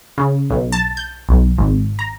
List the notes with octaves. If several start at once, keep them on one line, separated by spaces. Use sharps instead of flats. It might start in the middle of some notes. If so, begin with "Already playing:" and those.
C#3
B1
A5
G6
B1
G#1
A#5